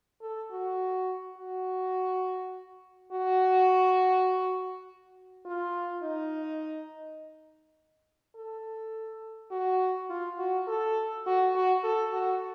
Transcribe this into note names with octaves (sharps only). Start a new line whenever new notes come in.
A4
F#4
F#4
F#4
F4
D#4
A4
F#4
F4
F#4
A4
F#4
F#4
A4
F#4